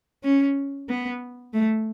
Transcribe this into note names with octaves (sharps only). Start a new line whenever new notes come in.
C#4
B3
A3